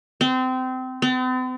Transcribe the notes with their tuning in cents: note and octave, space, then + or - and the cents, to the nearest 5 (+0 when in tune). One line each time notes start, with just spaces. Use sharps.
C4 -25
C4 -45